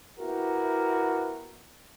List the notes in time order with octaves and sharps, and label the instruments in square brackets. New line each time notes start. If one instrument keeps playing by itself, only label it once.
[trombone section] B3 E4 F#4 G4 A#4